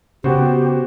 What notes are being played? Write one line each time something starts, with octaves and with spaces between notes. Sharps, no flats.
C#3 B3 F#4 G4 C5